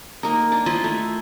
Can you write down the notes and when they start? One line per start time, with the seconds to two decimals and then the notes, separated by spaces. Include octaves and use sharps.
0.23 A#3 D#4
0.52 D4
0.66 E4 F4 C5 D#5
0.84 A3